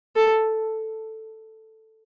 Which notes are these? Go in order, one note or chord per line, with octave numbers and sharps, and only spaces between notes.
A4